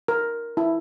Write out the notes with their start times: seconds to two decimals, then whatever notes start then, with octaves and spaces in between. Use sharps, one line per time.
0.08 A#4
0.57 E4